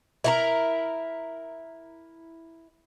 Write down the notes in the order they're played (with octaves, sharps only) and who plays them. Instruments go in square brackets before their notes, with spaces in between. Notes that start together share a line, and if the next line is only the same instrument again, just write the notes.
[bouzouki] E4 F4 A#4